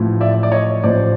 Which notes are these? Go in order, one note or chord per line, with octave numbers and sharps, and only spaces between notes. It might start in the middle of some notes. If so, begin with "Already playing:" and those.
Already playing: A1 A2 F3
D5 E5
D5
C#5 D#5
A1 A2 F3 C5 D5